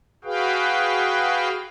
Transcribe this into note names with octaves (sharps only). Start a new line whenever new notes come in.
F#4 G#4 B4 F5 G5